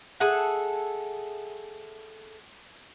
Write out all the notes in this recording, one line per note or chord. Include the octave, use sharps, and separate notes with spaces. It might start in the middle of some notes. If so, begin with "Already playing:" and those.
G#4 A4 E5 F#5